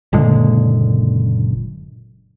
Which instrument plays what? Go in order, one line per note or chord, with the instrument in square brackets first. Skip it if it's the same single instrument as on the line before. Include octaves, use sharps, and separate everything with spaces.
[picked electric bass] F#1 A#2 D3 G#3